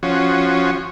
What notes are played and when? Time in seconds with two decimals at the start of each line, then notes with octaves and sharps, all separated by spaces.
0.03 F3 C#4 F#4